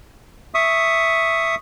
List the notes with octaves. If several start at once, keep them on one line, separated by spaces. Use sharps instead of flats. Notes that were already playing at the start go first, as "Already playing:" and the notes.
E5 C#6 D#6